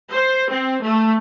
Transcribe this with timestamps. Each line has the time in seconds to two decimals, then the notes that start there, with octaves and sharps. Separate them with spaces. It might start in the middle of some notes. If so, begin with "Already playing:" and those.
0.13 C5
0.51 C4
0.82 A3